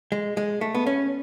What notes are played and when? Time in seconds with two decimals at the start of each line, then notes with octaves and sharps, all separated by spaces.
0.12 G#3
0.37 G#3
0.61 A3
0.75 B3
0.86 C#4